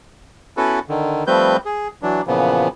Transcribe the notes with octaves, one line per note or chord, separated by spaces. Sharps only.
B3 C#4 E4 F#4 A4 B4
D3 D#3
F3 G3 A3 C4 B4 G6
G#4
E3 F#3 D4
A#2 C#3 E3 F3 B3